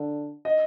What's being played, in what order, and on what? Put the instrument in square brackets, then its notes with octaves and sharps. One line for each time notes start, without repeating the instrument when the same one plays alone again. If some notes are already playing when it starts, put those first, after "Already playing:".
Already playing: [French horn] D3
[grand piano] D#5